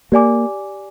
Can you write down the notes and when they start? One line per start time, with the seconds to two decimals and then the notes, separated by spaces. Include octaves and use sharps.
0.12 A#3 G4 D5 G#5 D6